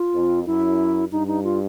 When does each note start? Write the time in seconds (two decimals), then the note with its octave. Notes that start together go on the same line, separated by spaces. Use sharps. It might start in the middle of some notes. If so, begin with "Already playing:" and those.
Already playing: F4
0.14 F2
0.46 F#2 E4
1.12 G2 D#4
1.28 D#4
1.44 F4